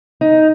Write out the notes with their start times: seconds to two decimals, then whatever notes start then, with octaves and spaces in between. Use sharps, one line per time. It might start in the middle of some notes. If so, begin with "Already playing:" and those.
0.21 D#4